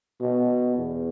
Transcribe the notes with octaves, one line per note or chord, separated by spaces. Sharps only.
B2
E2